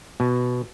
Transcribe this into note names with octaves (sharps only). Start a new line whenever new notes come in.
B2